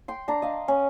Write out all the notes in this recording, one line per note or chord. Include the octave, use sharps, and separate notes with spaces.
G5 C6
D4 A#5
D#5 F5
C#4